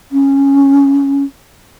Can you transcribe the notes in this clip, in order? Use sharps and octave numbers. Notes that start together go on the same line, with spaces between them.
C#4